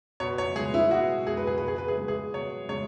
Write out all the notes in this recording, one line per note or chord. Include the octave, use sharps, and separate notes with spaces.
B2 C#5
C#5
G#3 G#4
E4
B2 F#4
G#3 G#4
B4
G#4
B2 B4
G#4
B4
G#4
G#3 B4
G#4
B2 C#5
G#3 C#5